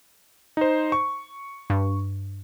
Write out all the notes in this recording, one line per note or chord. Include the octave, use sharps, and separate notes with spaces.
D#4 C5
C#6
G2